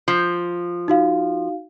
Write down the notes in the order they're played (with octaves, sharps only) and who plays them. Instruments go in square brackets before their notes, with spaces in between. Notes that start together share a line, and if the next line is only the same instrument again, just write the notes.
[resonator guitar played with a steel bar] F3
[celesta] D#4 F#4 F5